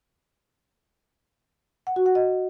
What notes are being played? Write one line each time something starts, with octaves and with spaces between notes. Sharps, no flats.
F#5
F#4
F#5
D#5